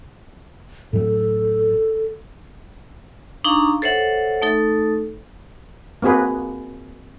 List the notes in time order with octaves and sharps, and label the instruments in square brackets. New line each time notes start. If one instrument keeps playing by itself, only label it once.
[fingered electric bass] A2 F#3 [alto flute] A4
[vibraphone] D4 D#4 F5 A#5 C#6
A4 C5 C#5 E5 F#5
A3 D#4 A4
[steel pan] A#3 C4 F#4 G#4 B4